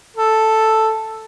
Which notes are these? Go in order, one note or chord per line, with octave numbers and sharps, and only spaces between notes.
A4